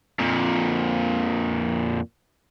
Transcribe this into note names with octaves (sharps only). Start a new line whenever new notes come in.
F2 A#2